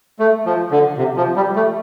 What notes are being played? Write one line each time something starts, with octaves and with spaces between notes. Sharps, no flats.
A3
F3
D3
C3
F3
G3
A3